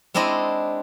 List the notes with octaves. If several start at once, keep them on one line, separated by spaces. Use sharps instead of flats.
G#3 C4 D4 E4 D#5